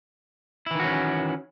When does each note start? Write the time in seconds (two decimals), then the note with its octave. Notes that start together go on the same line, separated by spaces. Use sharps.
0.66 E4
0.71 E3
0.75 D#3
0.80 F#4
0.84 C#4